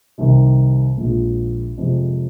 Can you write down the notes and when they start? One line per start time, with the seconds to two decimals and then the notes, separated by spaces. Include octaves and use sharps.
0.18 C2 C3 D#3
0.97 A#1 A#2 F3 G#3 F4
1.78 F2 C3 G#3